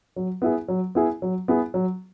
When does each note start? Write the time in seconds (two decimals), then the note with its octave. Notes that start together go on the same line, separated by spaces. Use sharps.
0.16 F#3
0.42 B3 E4 G#4
0.68 F#3
0.95 B3 E4 G#4
1.22 F#3
1.48 B3 E4 G#4
1.74 F#3